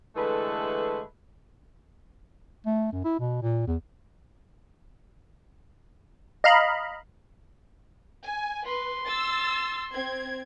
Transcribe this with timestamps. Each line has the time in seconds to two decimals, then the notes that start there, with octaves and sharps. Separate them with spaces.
0.16 D3 E3 G#3 A3 A4 B4
2.66 A3
2.92 F#2
3.05 E4
3.20 B2
3.42 A#2
3.67 E2
6.44 D#5 F5 A#5 B5
8.24 G#5
8.66 B4 C6
9.06 E6 A6
9.93 C4 G#6